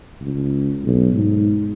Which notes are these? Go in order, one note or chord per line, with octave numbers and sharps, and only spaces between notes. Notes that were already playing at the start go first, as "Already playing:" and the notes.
C#2
B1
G#2